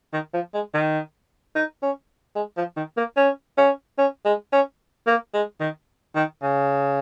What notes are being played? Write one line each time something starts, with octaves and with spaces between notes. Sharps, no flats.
D#3
F3
G#3
D#3
D#4
C#4
G#3
F3
D#3
A#3
C#4
C#4
C#4
G#3
C#4
A#3
G#3
D#3
D#3
C#3